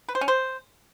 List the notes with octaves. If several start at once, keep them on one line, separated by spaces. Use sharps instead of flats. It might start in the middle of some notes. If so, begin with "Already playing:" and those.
B4
C5
C#4
C5